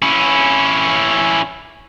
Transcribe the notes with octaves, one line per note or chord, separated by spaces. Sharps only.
C#4 E4